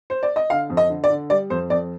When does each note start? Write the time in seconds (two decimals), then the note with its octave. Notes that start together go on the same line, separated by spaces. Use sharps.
0.10 C5
0.23 D5
0.36 D#5
0.50 D3 F5
0.70 F2
0.77 D#5
0.90 D3
1.04 D5
1.10 D3
1.30 G3 D5
1.50 F2 C5
1.70 F2 D5